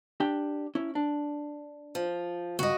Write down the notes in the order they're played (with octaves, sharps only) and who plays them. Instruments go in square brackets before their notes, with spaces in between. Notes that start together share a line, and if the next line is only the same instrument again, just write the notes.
[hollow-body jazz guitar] D4 G4 G5
C#4 E4
D4
[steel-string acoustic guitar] F3
[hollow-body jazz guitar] C#2 G2 [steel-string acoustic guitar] F#4 D#5